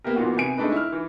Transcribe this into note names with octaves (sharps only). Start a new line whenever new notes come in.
A#3 B3 G4 A#4
A#2 E3 B3 F4 F#4
C3 B3 G#5 D7
G#3 A3 D4 D#4 B4
E4 F6
E3